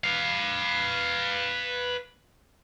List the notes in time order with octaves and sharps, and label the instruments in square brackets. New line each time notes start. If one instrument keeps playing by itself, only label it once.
[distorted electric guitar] B4 F5